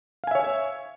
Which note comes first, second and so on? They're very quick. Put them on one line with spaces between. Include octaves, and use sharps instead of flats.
F5 G#5 E5 C#5